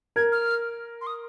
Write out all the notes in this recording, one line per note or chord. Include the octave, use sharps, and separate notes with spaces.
A#4 G#6
F6
C6
D#6